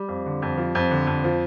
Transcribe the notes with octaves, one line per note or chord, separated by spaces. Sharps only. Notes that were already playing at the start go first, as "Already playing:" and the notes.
Already playing: G3
F2
D3
F2
F3
F2
D3
F2
F3